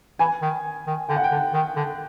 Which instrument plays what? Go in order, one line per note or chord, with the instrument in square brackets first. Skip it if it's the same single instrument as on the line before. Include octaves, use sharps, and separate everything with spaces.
[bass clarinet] E3 [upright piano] G#5
[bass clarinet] D#3
D#3
[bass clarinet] D3 [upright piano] G5
[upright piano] F#5
G5
[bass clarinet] D3
D#3
D3